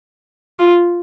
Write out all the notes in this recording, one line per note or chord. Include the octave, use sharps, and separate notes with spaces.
F4